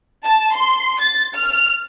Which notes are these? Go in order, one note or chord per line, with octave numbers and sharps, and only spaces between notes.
A5
C6
A6
F6